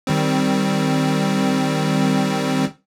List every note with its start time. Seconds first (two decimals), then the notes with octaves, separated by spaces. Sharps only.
0.07 D#3 G3 C4